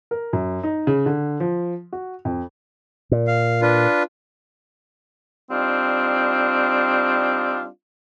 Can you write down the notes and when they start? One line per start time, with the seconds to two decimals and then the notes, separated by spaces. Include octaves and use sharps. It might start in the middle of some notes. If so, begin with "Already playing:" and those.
0.11 A#4
0.33 F#2
0.63 D#4
0.87 C#3
1.06 D3
1.40 F3
1.93 F#4
2.25 F2
3.11 A#2
3.27 F5
3.62 D4 F4 B4
5.51 G3 C4 D4 D#4 F4